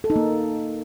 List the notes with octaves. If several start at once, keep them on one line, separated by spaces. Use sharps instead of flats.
A4
D#4
A#3